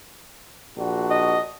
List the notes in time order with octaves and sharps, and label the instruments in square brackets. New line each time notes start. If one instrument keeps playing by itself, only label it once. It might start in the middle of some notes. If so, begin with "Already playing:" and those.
[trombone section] A#1 D4 F#4
[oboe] D#5